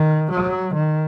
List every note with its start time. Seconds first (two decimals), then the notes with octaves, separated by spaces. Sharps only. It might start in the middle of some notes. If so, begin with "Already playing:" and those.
Already playing: D#3
0.31 F#3
0.74 D#3